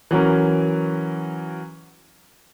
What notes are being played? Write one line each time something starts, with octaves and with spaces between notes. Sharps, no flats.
E3 F#3 C#4 A#4